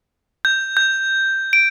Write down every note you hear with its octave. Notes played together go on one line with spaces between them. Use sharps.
G6
G6
D7